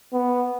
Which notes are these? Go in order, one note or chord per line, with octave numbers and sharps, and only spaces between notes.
B3